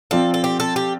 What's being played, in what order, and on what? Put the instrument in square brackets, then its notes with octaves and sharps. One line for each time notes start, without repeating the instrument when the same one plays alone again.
[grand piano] F3 C4 F4 D5 F5 [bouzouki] A4
[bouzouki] A4
G4
A4
G4